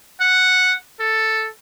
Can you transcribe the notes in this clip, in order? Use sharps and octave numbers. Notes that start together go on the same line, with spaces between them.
F#5
A4